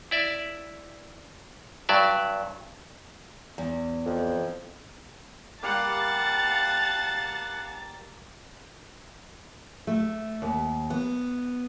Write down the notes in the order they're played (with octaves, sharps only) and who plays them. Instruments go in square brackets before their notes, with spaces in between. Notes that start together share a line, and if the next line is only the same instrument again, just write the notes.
[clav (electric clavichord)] E4 D5 E5
G2 F#3 D5 E5
[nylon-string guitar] E2
[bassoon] F2
[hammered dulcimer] G3 A#3 [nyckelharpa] F5 F#5 [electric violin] A5 A6
[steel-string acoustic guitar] A3
D#2
B3